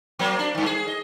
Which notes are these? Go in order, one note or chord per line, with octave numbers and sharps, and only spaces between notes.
F#3 A#3 C4
D4
G2 D#3
G#4
D#5